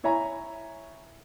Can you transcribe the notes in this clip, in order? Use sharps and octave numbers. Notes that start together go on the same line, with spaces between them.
E4 C#5 E5 G#5 A#5